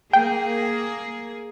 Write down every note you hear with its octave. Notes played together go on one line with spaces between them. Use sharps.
A#3 G#4 G5